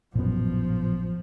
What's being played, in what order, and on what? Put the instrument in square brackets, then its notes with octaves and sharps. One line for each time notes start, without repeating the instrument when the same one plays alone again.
[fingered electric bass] A1 F#2 [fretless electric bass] A#2 B3 [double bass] F3